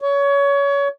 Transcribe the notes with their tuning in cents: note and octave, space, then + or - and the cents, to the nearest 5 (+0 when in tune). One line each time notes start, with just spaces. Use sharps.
C#5 +25